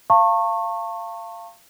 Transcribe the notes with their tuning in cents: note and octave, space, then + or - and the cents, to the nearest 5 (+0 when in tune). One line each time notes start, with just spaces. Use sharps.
F5 -20 A5 +35 C#6 -25